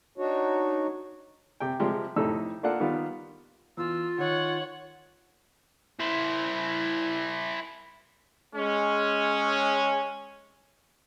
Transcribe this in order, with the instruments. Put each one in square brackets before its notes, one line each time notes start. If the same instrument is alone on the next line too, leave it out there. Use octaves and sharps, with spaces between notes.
[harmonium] D4 D#4 F#4 C#5
[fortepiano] C3 G5
C3 F3 G3 G#3 G4
F2 A2 C3 D#4 A4 E6
A#3 D4 F4 A4 F#5
D#3 G3 B3 F4
[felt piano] E2 [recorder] F4 [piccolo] E6
[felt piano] D#3 [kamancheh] C#5 [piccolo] F#5
[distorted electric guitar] E4 C5
[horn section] G#3 C#4